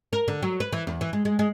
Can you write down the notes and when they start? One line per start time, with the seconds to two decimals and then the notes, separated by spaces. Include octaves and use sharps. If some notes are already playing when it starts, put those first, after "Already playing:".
0.13 A#4
0.28 D3
0.42 F#3
0.60 B4
0.73 E3
0.87 E2
1.01 E3
1.13 G#3
1.25 G#3
1.39 G#3